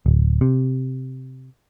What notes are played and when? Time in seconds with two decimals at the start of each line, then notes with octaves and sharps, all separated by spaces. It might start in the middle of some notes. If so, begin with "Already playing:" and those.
0.06 D1
0.41 C3